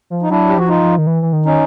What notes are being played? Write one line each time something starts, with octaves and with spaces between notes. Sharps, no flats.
F3
D#4
F#3 D4 E4
G4
F3 F#4
D#4 F4
F3
D#3
E3
E3
D#3
C#4 D#4